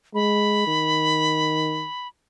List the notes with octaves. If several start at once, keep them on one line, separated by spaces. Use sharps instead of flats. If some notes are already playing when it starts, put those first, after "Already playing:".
G#3 B5
D#3